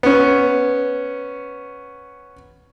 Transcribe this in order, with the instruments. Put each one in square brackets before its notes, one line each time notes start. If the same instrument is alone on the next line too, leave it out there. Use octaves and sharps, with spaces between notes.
[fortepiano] B3 C#4